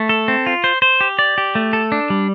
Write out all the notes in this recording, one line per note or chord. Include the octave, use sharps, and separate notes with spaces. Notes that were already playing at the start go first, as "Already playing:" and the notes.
Already playing: A3
A4
C4
F4
C5
C5
G4
D5
G4
A3
A4
D4
G3